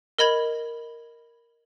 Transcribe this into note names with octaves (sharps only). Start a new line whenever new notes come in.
A#4 D#5 B5 G#6 F#7